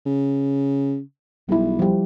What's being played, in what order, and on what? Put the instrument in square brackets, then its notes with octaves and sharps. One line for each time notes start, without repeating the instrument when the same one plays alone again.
[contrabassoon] C#3
[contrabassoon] B1 [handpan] G3 E4
[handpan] F3 G3